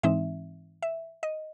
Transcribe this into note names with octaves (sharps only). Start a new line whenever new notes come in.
G#2 E3 G#3 C4 D#4 E5
E5
D#5